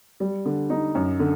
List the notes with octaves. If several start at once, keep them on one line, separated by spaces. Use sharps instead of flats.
G3
D3
D#4
F#2
D3